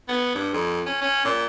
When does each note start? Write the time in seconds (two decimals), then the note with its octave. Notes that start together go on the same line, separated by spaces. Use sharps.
0.08 B3
0.35 G2
0.54 F2
0.86 C#4
1.02 C#4
1.25 A#2